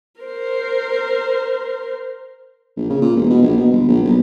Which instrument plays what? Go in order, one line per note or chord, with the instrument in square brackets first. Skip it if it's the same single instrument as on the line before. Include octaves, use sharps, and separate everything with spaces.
[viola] A#4 C5
[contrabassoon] A#1
C#3
A#2
E1
B2
A#1
B2
G1
A#1
B1